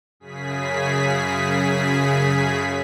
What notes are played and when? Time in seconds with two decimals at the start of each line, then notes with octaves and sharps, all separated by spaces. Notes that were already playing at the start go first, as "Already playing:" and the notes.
0.20 F#2 C#3 G#4 B6